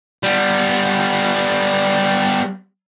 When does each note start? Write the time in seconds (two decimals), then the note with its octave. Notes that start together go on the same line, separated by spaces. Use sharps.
0.23 G3 B3